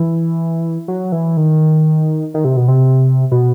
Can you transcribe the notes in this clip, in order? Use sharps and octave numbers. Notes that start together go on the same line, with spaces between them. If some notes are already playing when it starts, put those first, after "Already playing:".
Already playing: E3
F#3
E3
D#3
D#3
C3
B2
C3
B2